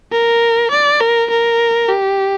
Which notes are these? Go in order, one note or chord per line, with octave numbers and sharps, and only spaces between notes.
A#4
D5
A#4
A#4
G4